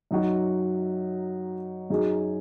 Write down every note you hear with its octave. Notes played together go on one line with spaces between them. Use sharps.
F#2 F#3 D#4 F#4
F#2 F#3 D#4 G#4